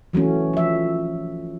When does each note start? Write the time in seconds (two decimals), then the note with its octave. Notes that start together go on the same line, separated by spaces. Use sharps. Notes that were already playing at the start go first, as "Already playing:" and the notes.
0.13 E3 F#3 A3 C#4
0.53 F3 E5